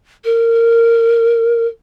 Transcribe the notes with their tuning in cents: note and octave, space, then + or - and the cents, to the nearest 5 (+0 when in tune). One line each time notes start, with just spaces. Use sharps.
A#4 -15